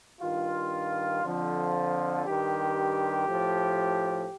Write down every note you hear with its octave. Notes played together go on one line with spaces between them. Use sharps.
G2 D#3 F4
F2 D3 F3
G2 D#3 G4
A2 F3